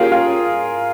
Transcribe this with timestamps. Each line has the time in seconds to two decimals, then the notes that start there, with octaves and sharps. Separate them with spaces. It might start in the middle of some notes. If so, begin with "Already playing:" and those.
Already playing: A#3 C#4 F4 G4 G#4 A#4
0.12 F4